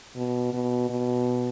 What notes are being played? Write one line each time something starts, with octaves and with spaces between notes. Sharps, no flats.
B2
B2
B2